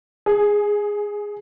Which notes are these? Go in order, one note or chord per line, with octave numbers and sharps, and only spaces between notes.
G#4